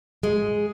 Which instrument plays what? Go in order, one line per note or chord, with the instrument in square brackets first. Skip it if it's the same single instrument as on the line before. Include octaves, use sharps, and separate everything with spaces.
[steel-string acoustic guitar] G#3